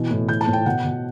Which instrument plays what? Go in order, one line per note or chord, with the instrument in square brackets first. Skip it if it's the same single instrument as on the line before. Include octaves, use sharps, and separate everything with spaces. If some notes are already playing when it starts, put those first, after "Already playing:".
Already playing: [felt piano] B2 E3
A2
E3 G6
A5
A2
G5
B2 F#5
B2